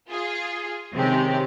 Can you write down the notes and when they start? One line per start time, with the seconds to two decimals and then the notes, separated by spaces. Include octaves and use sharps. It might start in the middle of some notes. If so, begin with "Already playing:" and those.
0.11 F4 G#4
0.93 C3 D#3 G#3 C4 C#4 G4